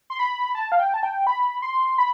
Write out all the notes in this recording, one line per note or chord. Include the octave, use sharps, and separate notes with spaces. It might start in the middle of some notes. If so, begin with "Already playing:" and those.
C6
B5
A5
F5
G5
A5
G5
B5
C6
B5